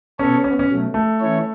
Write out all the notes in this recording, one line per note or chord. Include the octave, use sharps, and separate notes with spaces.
B2 B3 C#4 A4 C#5
C#4
B3
C#4
B2 F#3 A3
A3
E3 C#4 E4 C#5